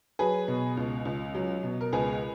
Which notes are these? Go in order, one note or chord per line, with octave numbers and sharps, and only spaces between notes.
F#3 G#4 B4
B2
C#2
C#2
F#3
B2
A#4
C#2 G#4 B4